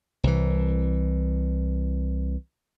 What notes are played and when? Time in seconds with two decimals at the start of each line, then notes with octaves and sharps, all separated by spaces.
0.23 C2 E3